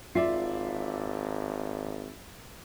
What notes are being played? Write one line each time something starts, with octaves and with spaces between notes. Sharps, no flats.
G#1 F4 D5 E5 C7